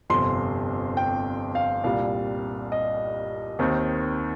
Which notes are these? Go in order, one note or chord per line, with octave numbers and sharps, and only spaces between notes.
G1 F2 C3 C6
G5
F5
C2 A#2 G3 F5
D#5
D#2 D#3 C4 D#4